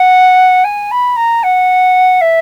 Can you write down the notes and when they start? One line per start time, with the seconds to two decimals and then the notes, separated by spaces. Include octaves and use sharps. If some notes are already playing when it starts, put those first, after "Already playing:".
Already playing: F#5
0.64 G#5
0.91 B5
1.16 A#5
1.43 F#5
2.21 E5